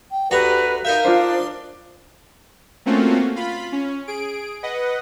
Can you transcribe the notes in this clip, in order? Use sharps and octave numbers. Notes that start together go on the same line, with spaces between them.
G5
D2 F#4 G4 B4 A#5
D#4 A#4 E5 F5 G6
D4 F4 C5
A3 A#3 C4 C#4 F4 F#4
F4 B5
C#4
G#4 D7
B4 D#5 F#5